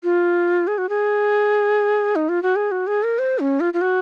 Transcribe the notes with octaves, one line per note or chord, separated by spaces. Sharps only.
F4
G#4
F#4
G#4
D#4
F4
F#4
G#4
F#4
G#4
A#4
C5
C#4
F4
F4
F#4